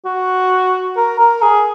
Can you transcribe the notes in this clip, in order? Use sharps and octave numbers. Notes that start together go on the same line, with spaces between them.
F#4
A#4
A#4
G#4